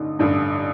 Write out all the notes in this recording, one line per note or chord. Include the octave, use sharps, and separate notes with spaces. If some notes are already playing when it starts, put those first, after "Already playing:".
Already playing: A1 G2 D3 D#4
A1 G2 D3 D4